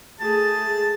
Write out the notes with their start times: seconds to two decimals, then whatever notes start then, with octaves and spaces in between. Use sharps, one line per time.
0.20 A3 G#4 A5